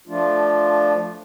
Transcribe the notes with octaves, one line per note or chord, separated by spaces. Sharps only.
F3 A3 D4 F4